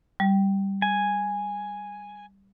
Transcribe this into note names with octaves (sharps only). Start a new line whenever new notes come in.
G3
G#5